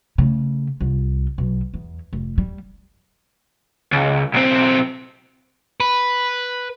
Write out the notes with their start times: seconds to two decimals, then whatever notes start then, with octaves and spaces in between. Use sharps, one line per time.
0.18 C#3 A3
0.80 C2 F4
1.38 B1 F#3
1.74 E2
2.13 F1
2.38 G3
3.92 C#2
4.34 B1 C4
5.80 B4